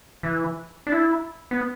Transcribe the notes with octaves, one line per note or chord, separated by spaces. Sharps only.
E3
D4
E4
B3